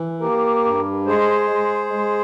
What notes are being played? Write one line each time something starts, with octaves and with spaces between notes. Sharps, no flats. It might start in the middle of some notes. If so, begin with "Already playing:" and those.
Already playing: E3
A#3 G4 A#4
G2
G#3 G#4 C5
G#3
G#3